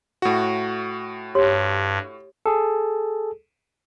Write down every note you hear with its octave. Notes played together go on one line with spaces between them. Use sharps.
A2 F#4
G2 G4 C#5 C6
G#4 A4